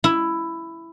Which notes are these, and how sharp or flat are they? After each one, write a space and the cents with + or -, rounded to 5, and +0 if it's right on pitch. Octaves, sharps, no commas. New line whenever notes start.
E4 +10